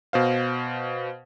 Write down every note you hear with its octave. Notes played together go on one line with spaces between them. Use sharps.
B2 C5 F5